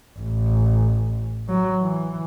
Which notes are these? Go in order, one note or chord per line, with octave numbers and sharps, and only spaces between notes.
A1
F#3
E3